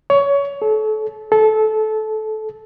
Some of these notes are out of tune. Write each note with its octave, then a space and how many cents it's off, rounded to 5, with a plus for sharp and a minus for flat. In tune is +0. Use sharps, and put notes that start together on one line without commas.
C#5 +20
A4 -30
A4 -20